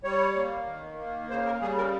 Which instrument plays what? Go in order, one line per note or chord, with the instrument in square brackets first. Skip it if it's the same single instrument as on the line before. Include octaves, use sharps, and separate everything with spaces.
[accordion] G3 C#5
A#3
D#3
A#3
C#3 C5
A#4
G3 G#4
A#4